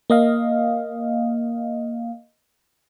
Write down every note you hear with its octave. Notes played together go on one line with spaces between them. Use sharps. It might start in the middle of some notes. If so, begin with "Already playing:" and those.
A#3 D#5 F5